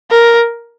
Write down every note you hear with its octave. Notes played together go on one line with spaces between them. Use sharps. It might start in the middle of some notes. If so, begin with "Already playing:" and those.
A#4